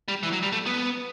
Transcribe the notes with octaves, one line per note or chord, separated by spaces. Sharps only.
G3
E3
F#3
G3
A3
B3